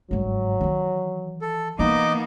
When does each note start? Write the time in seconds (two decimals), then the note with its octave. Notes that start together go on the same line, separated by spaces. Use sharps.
0.11 G1 G#2 F#3
0.61 D#3 E3
1.42 A4
1.79 E3 A#3 B3 D#4 D#5 D6